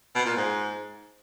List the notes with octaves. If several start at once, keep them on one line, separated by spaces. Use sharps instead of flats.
B2
A#2
G#2